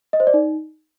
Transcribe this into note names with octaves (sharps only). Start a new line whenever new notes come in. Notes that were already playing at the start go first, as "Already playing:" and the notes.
D#5
C5
D5
D#4